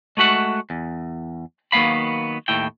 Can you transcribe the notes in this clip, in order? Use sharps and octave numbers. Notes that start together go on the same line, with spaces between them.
G#3 A3 F#4 E5 F#5
E2
D#3 F#3 A#3 B3 F5 B5
D#2 A2 E4 G5